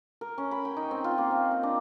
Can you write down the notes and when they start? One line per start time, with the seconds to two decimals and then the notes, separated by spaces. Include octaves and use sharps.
0.21 A#4
0.38 C#4
0.51 B5
0.65 G5
0.77 D#4
0.91 C4
1.04 F4
1.18 A#3
1.31 C4
1.51 A#5
1.63 D4